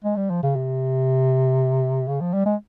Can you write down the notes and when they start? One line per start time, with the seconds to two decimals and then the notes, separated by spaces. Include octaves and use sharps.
0.04 G#3
0.17 G3
0.30 F3
0.43 C#3
0.56 C3
2.08 C#3
2.21 F3
2.33 G3
2.46 G#3